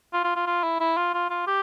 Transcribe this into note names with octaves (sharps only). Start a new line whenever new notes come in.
F4
F4
F4
F4
E4
E4
F4
F4
F4
G4